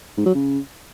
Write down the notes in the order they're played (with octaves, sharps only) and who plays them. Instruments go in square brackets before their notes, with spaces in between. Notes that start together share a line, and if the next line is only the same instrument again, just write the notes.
[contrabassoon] G#2
F#3
C#3